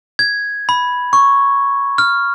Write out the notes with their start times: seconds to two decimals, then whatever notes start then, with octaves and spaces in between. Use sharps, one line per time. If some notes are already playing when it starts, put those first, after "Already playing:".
0.19 G#6
0.69 B5
1.13 C#6
1.98 F6